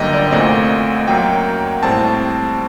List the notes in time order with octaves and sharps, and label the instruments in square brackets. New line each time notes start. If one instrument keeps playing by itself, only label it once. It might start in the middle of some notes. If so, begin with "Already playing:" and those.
Already playing: [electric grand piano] G1 F#2 D3 G3 A#3 D#5 G5
D5
C2 A#2 A3 C4 D#5
F#2 F#3 A#3 G5
A2 G3 C4 A5